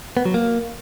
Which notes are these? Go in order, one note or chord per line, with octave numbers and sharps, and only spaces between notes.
B3
F#3
A#3